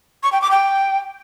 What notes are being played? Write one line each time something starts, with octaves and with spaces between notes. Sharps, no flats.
C#6
G5
D6
G5